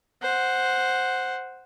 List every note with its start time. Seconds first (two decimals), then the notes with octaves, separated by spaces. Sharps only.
0.22 C5 F#5